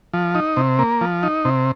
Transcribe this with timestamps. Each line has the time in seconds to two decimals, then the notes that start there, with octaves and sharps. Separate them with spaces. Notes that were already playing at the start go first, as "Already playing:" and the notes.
0.13 F3
0.35 D#4
0.57 C3
0.79 A#3
1.01 F3
1.23 D#4
1.45 C3